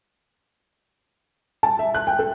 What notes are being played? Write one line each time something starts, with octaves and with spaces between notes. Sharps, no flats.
A5
E5
F#6
G5
A4